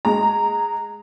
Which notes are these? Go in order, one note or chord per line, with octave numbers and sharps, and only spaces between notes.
G#3 A#5